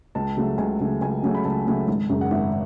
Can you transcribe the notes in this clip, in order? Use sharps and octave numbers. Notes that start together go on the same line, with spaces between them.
C#2 A5
C#3 F#3 A3
C#2 G#5
C#3 F#3 A3
C#2 G#5
C#3 F#3 A3
B5
C#2 A5
C#3 F#3 A3
G#1
F#2 C#3
F#5
G#1 E5